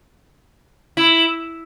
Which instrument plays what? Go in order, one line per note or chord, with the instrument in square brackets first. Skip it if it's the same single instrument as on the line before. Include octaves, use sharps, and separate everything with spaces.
[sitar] E4